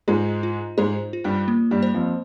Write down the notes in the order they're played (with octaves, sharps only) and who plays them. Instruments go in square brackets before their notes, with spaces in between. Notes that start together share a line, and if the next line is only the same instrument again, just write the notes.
[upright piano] G#2 G#3 [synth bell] F4
[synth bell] F4
[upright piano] G#2 G#3 [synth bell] C5
[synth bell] F4
[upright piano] G2 G3
[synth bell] A#3
[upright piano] G2 G3
[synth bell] C5
[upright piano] F2 F3